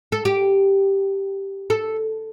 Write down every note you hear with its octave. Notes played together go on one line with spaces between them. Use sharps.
A4
G4
A4